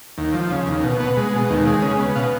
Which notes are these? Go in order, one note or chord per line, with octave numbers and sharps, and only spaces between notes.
D#2
F3
C#3
D#2
B2
B3
G#3
B2
D#2
G#3
C#3
B3
B2 F5